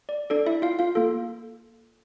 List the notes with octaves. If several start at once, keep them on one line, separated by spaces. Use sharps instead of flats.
D5
D4 A4 D5
E4 E5
F4 F5
F4 F5
A#3 F4 A4